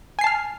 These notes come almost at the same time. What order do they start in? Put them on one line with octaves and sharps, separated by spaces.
G#5 C7 A5 F6